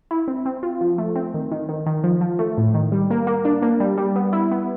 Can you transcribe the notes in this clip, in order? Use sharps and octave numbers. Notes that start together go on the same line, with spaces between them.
E4
C4
C4
F4
F3
A3
C4
D#3
D#3
D#3
D#3
F3
F3
A3
A2
D#3
G3
A#3
A#3
D4
A#3
G3
G3
B3
E4
B3